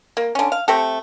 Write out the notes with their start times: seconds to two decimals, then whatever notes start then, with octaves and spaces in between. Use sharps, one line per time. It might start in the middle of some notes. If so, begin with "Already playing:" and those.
0.17 A#3
0.35 D3 C#4
0.52 F5
0.68 A3 C4 G4 A4